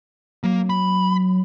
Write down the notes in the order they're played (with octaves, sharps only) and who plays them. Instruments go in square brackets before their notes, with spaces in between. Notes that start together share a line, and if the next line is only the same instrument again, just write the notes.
[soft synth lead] F#3 [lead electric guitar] A#3
[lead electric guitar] B5